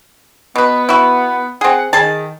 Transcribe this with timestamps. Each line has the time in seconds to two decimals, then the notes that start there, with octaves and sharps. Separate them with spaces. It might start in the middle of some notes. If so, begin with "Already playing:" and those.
0.56 B2 B3 B4
0.89 E4 F#4
1.61 C4 G#4 F#5
1.93 D#3 G#4 A5